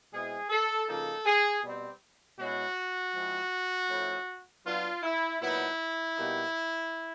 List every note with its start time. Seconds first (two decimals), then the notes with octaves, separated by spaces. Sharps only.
0.11 B2 G#3 C4 E4 G#4
0.49 A4
0.88 C#3 F3 A#3 D#4 A4
1.26 G#4
1.63 B2 G3 C4
2.38 B2 G#3 C#4 E4 F#4
3.14 F3 G#3 C4 E4
3.90 F3 A3 C#4 E4
4.65 F#3 B3 D4 F4
5.03 E4
5.41 A#2 F#3 B3 D#4 E4
6.16 B2 G3 A#3 D#4